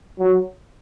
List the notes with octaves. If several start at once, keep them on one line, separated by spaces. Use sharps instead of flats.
F#3